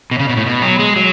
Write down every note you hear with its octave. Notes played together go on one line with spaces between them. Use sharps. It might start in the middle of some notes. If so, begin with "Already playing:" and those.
B2
C#3
B2
A2
B2
F#3
G#3
F#3